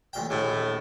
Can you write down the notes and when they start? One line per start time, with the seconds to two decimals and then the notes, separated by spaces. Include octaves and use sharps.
0.13 A1 A#2 G5
0.30 A#1 D#2 A2